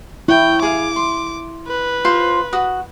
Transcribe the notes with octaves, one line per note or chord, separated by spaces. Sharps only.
E4 C#5 G5
G#4 F5 D6
C6
B4
F4 C5 C6
F#4 D#6